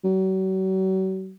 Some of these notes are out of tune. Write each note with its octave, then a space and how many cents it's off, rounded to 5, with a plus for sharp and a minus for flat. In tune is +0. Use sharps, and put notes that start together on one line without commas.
F#3 +40